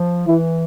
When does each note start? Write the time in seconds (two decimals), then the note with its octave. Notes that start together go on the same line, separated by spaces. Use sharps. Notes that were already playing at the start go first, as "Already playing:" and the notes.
Already playing: F3
0.27 E3 E4